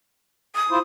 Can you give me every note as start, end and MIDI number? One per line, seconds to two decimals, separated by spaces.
0.55 0.79 87
0.70 0.79 64
0.70 0.79 65
0.70 0.79 72